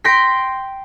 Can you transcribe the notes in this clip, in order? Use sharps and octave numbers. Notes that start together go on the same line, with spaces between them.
G5 C6 G6 A#6 B6